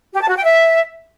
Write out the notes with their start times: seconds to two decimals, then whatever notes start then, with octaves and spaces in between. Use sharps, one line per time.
0.14 G4
0.22 A5
0.29 F#4
0.36 G5
0.44 E5